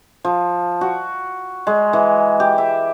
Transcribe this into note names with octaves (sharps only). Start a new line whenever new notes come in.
F3
F#4
G#3
E3
G4
E5